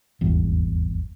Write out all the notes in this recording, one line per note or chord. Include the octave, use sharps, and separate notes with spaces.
D#1 G#1 E2